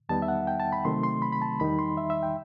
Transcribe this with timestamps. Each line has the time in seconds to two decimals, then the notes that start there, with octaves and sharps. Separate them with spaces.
0.09 E2 D#3 G3 B3 D#4 A5
0.22 E5
0.28 F#5
0.47 G5
0.60 A5
0.72 B5
0.85 C3 D#3 F#3 A3 C4 C6
1.03 C6
1.22 B5
1.32 B5
1.42 A5
1.60 E2 D#3 G3 D#4 B5
1.79 C6
1.97 E5
2.10 E5
2.23 G5